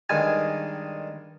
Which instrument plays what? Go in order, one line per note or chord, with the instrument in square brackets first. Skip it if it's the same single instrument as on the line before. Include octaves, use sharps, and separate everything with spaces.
[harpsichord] G2 D#3 G#3 G#5